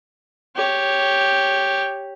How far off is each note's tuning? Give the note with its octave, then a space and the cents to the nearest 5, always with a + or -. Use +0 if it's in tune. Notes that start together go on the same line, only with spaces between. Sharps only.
G4 +0 C#5 +0